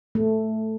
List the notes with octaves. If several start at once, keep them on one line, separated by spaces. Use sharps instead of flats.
A3